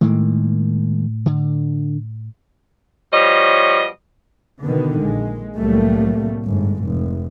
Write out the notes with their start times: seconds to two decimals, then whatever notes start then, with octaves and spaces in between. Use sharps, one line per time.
0.01 A2 D#3 G#3 A#3
1.26 D3
3.13 B2 F3 G3 C#5 D#5
4.65 B2 D3 D#3 B3
5.00 A#1 G#3
5.57 C2 A2 F#3 G3 A3 A#3
6.45 G1 G#2
6.84 F1